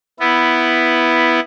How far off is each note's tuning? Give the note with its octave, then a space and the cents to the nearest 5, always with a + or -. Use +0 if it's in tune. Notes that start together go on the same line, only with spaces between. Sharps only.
B3 +0 E4 +0